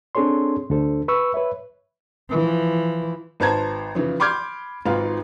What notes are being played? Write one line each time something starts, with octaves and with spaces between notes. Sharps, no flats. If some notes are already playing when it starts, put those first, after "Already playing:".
C4 D4 G#4 A4 C#5 C6
D2 D4 A4 C5
B4 C#6 E6
B4 C#5 E5
E3 F3
G#1 B4 C5 A5 A#5 G#6
C#3 E3 F3
B5 C6 D6 F6 G6 G#6
G#1 G#2 F4 B4 F5